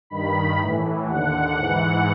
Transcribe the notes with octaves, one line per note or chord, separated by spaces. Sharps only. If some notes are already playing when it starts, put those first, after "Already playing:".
G2 D#3 B5
A2 E3
D#2 D3 F#5
G#2 E3 F#5